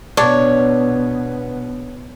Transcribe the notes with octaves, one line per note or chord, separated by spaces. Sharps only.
B2 B3 D4 C#5